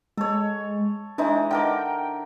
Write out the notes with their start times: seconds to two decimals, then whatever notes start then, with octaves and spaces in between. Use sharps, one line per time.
0.17 G#3 A4 C#5
1.18 E3 G#3 D4 D#4
1.51 D3 A#4 G5 D6